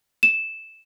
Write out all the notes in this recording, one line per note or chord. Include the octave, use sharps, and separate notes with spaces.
E7